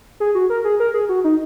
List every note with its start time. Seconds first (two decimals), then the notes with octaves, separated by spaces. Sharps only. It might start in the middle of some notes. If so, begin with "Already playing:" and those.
0.20 G#4
0.35 F#4
0.50 A#4
0.64 G#4
0.80 A#4
0.94 G#4
1.09 F#4
1.24 D#4